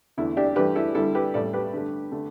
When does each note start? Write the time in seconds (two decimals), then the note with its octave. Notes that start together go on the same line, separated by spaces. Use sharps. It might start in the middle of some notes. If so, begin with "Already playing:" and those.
0.17 E2 D3 A3 E4
0.37 D4 G4
0.56 G2 E3 A3 G4 B4
0.75 E4 A4
0.95 G2 D3 G3 E4 A4
1.15 G4 B4
1.34 A1 A2 G3 A4 D5
1.54 G4 B4
1.73 G2 D3 A3
2.12 D3 A3